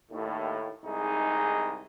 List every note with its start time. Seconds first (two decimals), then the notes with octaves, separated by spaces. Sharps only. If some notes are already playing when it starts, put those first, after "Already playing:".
0.11 D#2 A2
0.85 C2 G#2 D#4 G#4